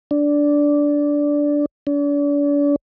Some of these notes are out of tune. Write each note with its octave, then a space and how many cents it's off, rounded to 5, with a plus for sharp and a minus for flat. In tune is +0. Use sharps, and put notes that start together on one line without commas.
D4 -10
D4 -40